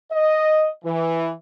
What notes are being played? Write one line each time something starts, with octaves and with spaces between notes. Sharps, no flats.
D#5
E3